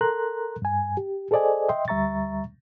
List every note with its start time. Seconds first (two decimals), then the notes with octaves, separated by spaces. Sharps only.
0.01 A4 A#4 A#5 C6 F#6
0.62 G2 G#5
0.97 G4
1.31 G#4 A4 C5 D5 D#5 G#5
1.68 D#5 E5 G5 C6
1.88 D2 G3 E5 A#5 C#6 A6